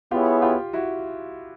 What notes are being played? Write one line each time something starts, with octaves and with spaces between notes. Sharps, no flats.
B3 E4 F4 G4 G#4 C#5
F4 G4
E4 F#4